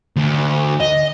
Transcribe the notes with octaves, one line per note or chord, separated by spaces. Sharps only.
D2
D#5